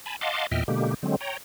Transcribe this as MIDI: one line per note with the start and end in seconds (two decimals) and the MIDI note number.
0.06 0.16 80
0.06 0.16 81
0.06 0.16 83
0.21 0.47 75
0.21 0.47 77
0.21 0.47 78
0.21 0.47 81
0.21 0.47 84
0.21 0.47 86
0.51 0.63 40
0.51 0.63 46
0.51 0.63 75
0.51 0.63 76
0.51 0.63 79
0.51 0.63 89
0.68 0.94 47
0.68 0.94 50
0.68 0.94 56
0.68 0.94 58
0.68 0.94 67
1.03 1.16 50
1.03 1.16 54
1.03 1.16 56
1.03 1.16 60
1.21 1.37 73
1.21 1.37 79
1.21 1.37 82